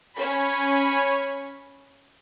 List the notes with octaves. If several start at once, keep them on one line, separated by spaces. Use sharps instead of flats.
C#4 C#5 B5